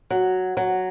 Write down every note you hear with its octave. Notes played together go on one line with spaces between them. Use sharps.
F#3
F#3